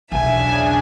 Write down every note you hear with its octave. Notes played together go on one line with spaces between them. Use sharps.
B1 E2 C#3 D4 E5 G#5